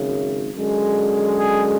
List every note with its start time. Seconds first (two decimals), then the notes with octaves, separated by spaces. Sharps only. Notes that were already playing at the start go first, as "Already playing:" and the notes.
Already playing: G#1 F#2 C#3
0.55 F#2 D3 G#3
1.38 G#4